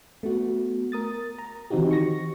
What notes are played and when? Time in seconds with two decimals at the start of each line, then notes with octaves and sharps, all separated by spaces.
0.23 A3 B3 F#4
0.92 A#4 D#6 A6
1.38 A#5
1.70 D#3 E3 C4 D#4 F#4 G4
1.91 C#6 A#6